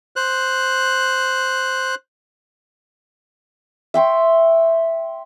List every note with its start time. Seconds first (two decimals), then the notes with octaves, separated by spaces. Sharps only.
0.16 C5 F#6
3.94 E5 G5 C6 C#6